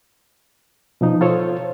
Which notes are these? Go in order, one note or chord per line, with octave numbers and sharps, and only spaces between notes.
B2 F3 D#4
F4 A4 C5 C#5